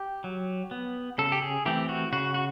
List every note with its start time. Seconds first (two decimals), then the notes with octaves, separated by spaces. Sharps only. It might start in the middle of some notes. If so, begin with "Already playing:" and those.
Already playing: G4
0.24 F#3
0.71 B3
1.18 C#3 A4
1.32 G4
1.42 G#4
1.66 E3 A3 C4 G4
1.89 F#4
2.13 C#3 F#4
2.34 F#4